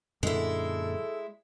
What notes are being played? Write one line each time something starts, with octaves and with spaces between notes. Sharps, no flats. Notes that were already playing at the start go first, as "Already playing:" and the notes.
F#2 A#2 D3 G#3 E4 A4